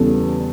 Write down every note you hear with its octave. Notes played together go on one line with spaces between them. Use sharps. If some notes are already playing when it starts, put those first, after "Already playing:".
Already playing: E2 C#3 G3 B3 A4